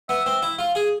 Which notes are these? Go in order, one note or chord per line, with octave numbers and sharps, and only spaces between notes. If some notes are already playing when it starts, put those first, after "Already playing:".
B3 E5
C4
E4
F4
G#4